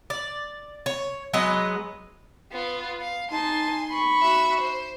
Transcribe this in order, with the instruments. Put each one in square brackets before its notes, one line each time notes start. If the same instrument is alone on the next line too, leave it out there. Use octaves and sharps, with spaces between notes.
[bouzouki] D5
C#5
F#3 G#3 B3 D#5
[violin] B3 F4
F5
[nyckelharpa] D#4 A5 [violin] G#5 C6
[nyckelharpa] B5 C#6
[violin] F#4 E5
C5